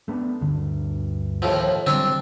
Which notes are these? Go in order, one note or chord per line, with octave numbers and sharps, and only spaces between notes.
A3 B3 D4
D2 G2 D3
D#2 A2 F3
D3 F#3 G3 C4 D4